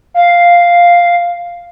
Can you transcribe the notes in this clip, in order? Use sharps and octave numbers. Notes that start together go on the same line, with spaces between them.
F5